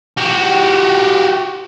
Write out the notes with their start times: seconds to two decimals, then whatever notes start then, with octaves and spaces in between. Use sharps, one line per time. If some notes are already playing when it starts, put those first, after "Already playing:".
0.18 F#4 G4